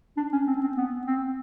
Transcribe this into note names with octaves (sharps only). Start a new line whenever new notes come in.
D4
C#4
C4
C#4
C4
B3
C4